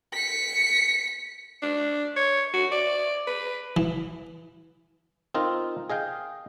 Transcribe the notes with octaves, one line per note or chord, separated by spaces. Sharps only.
B6 C#7
D4
C#5
F#4
D5
B4
E3
C4 D#4 F4 A#4
G#4 D#5 F5 G5